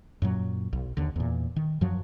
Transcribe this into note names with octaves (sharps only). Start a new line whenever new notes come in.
F#2 A#2 F#3
B1
D#2 D3
E2 A#2
D#3
F#2 F3 F#3